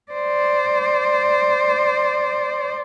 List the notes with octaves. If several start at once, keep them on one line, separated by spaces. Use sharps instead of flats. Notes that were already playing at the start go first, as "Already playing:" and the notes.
C5 D5